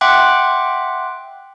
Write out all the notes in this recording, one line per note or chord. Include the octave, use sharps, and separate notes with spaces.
E5 F#5 G5 C6 D6 F#6